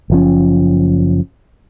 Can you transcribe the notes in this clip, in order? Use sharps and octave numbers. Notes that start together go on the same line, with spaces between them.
F#1 F3 C#4